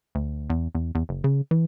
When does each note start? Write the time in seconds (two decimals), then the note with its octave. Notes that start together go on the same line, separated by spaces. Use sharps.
0.15 D2
0.50 E2
0.75 E2
0.95 E2
1.09 F#1
1.24 C#3
1.51 E3